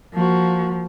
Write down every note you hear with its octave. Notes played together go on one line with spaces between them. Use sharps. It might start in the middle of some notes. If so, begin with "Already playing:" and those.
F3 A#3 F#4